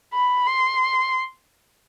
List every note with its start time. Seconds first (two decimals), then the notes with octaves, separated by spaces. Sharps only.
0.14 B5
0.47 C6